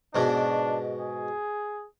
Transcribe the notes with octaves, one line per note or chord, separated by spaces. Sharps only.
G#2 B2 D4
G#4